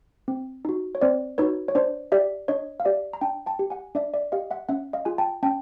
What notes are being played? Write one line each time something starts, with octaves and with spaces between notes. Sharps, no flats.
C4
D#4 F#4
C#5
C4 C5 D5
D#4 F#4 B4 C#5
C#5
D4 C5 D5
G4 D5 E5
D4 C#5 D#5
F5
G4 D5 E5
A#5
D4 G5 A5
G5 A5
G4
F#5 G#5
D4 D5 E5
D5 E5
G4 D#5 F5
E5 F#5
C#4 E5 F#5
D#5 F5
F4 G#4 G#5
G5 A5
C#4 G5 A5